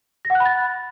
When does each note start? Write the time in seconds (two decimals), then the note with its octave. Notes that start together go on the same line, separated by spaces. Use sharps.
0.25 A#6
0.30 F#5
0.35 F#6
0.40 B5
0.45 A6